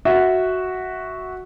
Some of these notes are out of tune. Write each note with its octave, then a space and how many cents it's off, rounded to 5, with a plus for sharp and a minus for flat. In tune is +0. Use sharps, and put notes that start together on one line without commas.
F#4 +0 E5 -15